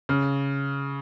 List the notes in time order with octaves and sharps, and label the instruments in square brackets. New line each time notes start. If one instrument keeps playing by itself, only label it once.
[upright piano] C#3